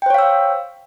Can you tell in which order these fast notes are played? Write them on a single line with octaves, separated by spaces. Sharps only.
G5 C5 C#5 F5 E6